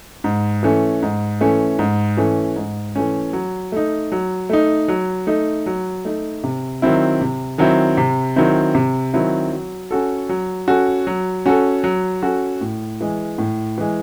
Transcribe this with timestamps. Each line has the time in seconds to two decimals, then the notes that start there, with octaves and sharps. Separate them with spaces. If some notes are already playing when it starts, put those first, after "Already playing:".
0.24 G#2
0.63 E3 A3 C#4
1.02 G#2
1.41 E3 A3 C#4
1.79 G#2
2.17 E3 A3 C#4
2.56 G#2
2.96 E3 A3 C#4
3.33 F#3
3.72 A3 D#4
4.12 F#3
4.50 A3 D#4
4.88 F#3
5.27 A3 D#4
5.66 F#3
6.05 A3 D#4
6.44 C3
6.82 D#3 F#3 C4 E4
7.21 C3
7.58 D#3 F#3 C4 E4
7.97 C3
8.36 D#3 F#3 C4 E4
8.75 C3
9.14 D#3 F#3 C4 E4
9.52 F#3
9.91 C#4 F#4 A4
10.29 F#3
10.68 C#4 F#4 A4
11.07 F#3
11.46 C#4 F#4 A4
11.84 F#3
12.23 C#4 F#4 A4
12.61 A2
13.01 E3 G#3
13.38 A2
13.78 E3 G#3